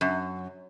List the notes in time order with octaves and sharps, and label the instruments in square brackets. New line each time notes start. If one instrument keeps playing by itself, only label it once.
[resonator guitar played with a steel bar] F#2